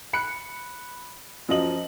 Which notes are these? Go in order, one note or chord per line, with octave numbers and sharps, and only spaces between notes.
B5 F#6 C#7
F#2 F3 D#5 F#7